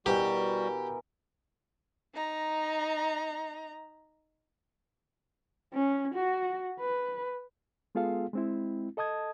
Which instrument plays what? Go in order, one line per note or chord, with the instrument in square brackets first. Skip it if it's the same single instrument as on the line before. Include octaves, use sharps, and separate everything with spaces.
[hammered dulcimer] B2 E3 A#4 [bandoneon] G3 F#4 [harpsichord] G4
[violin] D#4 A#5
[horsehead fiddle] C#4
F#4
B4
[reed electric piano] G#3 B3 F4 G#4 A4 F5
G#3 C4 E4
A4 D#5 A5 D#6 G#6